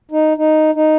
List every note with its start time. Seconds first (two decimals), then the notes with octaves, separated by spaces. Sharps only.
0.11 D#4
0.37 D#4
0.75 D#4